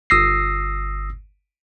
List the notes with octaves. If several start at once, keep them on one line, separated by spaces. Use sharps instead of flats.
G1 D#6 E6 A#6 C7